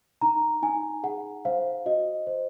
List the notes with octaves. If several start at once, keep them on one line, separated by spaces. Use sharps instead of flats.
D#4 A#5
D#4 G#5
G#4 F#5
C5 F5
F#4 D#5
C5